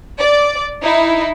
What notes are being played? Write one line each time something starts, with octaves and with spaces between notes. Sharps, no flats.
D5
D#4 E4